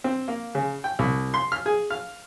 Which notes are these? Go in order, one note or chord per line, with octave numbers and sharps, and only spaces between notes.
C4
A#3
C#3
G5
C2
C6
F6
G#4
F5